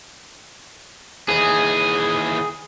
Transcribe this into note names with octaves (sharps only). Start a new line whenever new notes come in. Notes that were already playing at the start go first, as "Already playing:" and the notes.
D#2 E3 G#4